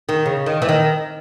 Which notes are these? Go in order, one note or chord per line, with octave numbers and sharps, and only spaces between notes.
D#3
C#3
D#3
E3
D#3